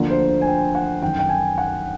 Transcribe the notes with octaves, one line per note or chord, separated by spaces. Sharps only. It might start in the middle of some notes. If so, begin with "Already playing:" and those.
Already playing: D2 D3 F3 A#3 D4
C5
G#5
G5
F#5
G#1 F#2 D#3 G5
G5
G#5
F#5